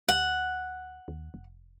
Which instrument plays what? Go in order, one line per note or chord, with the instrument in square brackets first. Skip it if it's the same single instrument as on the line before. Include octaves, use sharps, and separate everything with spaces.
[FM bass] D2 [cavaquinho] F#5
[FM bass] D#2
F1